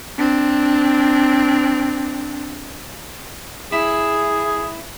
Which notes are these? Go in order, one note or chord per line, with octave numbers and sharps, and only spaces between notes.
C4 D4
E4 G#4